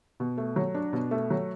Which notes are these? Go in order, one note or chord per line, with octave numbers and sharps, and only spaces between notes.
B2
A3
F#3
D4
B2
A3
F#3